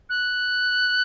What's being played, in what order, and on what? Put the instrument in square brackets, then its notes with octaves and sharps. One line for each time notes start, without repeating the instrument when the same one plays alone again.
[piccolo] F#6